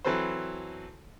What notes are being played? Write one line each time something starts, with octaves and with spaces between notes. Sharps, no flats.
E3 F#3 C4 A4 B4 C5